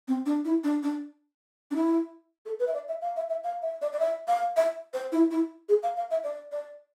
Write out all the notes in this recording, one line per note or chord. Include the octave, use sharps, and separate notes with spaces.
C4
D4
E4
D4
D4
D4
E4
A4
B4
E5
D5
E5
F5
E5
E5
F5
E5
D5
D5
E5
F5
E5
C5
E4
E4
G#4
F5
F5
E5
D5
D5